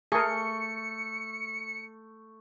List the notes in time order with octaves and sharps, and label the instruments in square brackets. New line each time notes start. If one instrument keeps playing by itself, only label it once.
[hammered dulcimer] A3 [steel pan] G#4 A#4 [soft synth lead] C#7